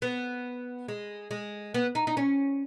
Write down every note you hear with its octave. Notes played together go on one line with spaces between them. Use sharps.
B3
G#3
G#3
B3
D#4
D#4
C#4